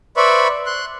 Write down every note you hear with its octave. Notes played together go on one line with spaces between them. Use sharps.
B4 C5 D5 E5 B5 C#6
C6 F#6